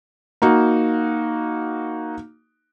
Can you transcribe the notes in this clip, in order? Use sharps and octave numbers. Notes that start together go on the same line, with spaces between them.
A#3 D#4 F#4